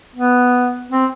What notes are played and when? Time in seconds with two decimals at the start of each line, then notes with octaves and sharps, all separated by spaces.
0.15 B3
0.91 C4